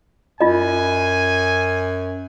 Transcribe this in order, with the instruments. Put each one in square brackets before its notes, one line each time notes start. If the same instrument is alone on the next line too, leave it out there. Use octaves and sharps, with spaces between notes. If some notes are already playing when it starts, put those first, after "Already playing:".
[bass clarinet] F#2 [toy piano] F4 D#5 [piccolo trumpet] G#5